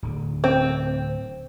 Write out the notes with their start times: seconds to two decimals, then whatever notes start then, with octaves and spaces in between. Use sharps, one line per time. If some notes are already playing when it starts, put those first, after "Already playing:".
0.03 D1 D3
0.44 C4